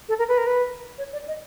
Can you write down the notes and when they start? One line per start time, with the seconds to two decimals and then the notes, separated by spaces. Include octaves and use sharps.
0.09 A4
0.19 A#4
0.28 B4
0.38 A#4
0.47 B4
0.98 C#5
1.13 D5
1.28 D#5